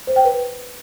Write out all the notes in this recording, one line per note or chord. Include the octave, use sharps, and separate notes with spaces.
C5
G5
B4